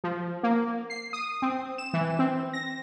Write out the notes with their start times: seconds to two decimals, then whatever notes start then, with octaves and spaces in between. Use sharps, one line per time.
0.04 F3
0.43 A#3
0.90 C7
1.13 D#6
1.42 C4
1.78 E7
1.94 E3
2.19 C4
2.53 A#6